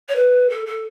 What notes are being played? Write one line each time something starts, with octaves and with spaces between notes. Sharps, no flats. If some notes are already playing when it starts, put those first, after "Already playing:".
C#5
B4
A4
A4